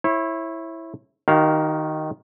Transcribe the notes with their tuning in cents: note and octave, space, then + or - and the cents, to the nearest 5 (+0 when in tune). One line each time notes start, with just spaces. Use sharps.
E4 +0 C#5 -35
D#3 +0 F#4 +45 F5 +0